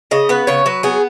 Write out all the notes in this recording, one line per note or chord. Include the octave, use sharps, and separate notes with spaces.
C#3 D#5
B3 B4
C#3 C#5
F#3 B4
B3 G#4